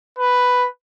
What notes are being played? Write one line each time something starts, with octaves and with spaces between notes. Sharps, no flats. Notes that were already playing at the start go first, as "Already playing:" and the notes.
B4